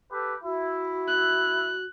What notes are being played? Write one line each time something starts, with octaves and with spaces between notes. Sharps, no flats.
G4 A4 B4
E4 F#4
F#6